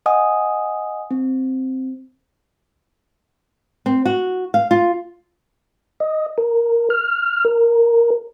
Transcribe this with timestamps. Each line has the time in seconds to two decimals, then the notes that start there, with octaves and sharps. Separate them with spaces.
0.06 D#5 F#5 G#5 D#6
1.11 C4
3.86 C4
4.06 F#4
4.54 F5
4.71 F4
6.00 D#5
6.38 A#4
6.90 F6
7.45 A#4